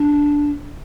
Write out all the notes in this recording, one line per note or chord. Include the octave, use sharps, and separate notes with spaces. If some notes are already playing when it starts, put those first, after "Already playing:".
Already playing: D4